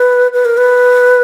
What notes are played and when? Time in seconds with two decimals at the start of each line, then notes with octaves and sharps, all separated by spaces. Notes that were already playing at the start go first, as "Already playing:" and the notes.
Already playing: B4
0.34 B4
0.45 A#4
0.57 B4